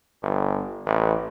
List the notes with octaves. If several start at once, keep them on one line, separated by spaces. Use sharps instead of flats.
G1
A1